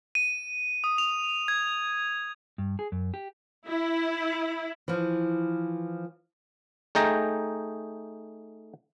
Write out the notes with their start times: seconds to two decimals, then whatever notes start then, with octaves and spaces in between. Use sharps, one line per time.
0.15 D#7
0.84 D#6
0.98 F7
1.48 G#6
2.58 G2
2.79 G#4
2.92 F#2
3.14 G4
3.65 E4
4.88 E3 F3
6.95 A3 D#4 G#4 G5 A#5